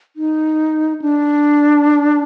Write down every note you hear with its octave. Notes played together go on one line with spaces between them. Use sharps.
D#4
D4